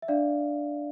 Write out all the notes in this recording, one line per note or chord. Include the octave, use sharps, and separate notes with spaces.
E5
D4 D5 F5